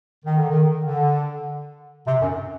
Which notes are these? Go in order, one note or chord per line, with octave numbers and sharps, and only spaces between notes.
D#3
D3
D#3
D3
C3
F#2